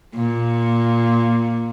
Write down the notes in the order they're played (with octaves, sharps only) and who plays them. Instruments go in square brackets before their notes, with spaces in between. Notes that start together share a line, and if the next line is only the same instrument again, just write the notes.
[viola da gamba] A#2